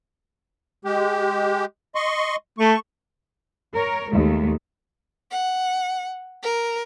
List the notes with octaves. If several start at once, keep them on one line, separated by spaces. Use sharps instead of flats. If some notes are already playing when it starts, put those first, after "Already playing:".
G#3 G4
D#5 C6 C#6
A3 C#6
A#4 C#5
D#2 G#3 A3
F#5
A#4